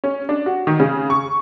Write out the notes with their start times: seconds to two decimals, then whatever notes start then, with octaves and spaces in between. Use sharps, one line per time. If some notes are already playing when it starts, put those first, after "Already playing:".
0.04 C#4
0.29 D4
0.46 F#4
0.67 D#3
0.80 C#3
1.10 C#6